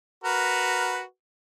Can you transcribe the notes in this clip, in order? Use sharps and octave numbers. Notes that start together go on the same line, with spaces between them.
F#4 A#4 B4